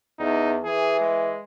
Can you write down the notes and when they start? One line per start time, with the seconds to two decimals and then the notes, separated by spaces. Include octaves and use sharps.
0.20 E2 D#4
0.64 E3 G#4
1.01 G#3